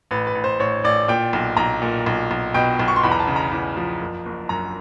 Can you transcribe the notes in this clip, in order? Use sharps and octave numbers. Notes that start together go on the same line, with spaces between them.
A1 B4
B4
A1
C5
A1 C#5
A1 D5
A#2 G5
B1
B1 A#5
A#2
B1
B1
B2 G5
B1
C#6
C6
E2 B5
A#5
A5
C#3
A#5
E2
F3
F#1
F#1
F#2 A#5